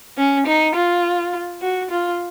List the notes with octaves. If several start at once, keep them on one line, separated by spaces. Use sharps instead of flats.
C#4
D#4
F4
F#4
F4